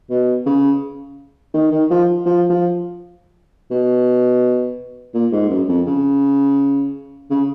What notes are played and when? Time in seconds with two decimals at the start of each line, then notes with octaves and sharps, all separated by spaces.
0.10 B2
0.46 C#3
1.54 D#3
1.72 D#3
1.91 F3
2.26 F3
2.50 F3
3.71 B2
5.14 A#2
5.32 G#2
5.50 F#2
5.68 F2
5.87 C#3
7.30 C#3